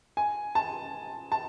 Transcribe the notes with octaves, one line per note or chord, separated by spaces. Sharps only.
G#5
A5
A5